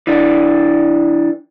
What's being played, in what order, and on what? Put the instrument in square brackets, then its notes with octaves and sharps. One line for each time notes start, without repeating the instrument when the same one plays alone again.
[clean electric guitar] E3 D4